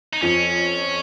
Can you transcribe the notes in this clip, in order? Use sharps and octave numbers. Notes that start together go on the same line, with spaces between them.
D#4
F2 F3 C#4